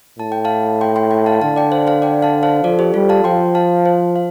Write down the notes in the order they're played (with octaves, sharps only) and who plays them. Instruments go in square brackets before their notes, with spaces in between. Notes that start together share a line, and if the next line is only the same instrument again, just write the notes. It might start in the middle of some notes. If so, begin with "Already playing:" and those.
[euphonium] A2 [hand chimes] A5
[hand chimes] G5
F5 A5
G5 C6
G5 C6
G5 C6
F5 A5
[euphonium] D3 [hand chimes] F5 A5
[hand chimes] D5 G5
C5 F5
C5 F5
D5 G5
F5 A5
C5 F5
[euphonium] F3 [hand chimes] A4 D5
[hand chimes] G4 C5
[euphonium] G3 [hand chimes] F4 A4
[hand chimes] F5 A5
[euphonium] F3 [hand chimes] G5 C6
[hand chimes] F5 A5
C5 F5
F5